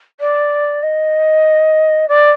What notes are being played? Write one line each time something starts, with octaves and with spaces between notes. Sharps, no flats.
D5
D#5
D5